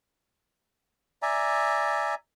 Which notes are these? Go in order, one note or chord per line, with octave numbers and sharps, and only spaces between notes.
D5 E5 G#5 A#5